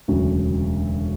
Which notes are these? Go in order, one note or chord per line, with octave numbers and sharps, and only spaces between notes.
E1 D2 C#3 F#3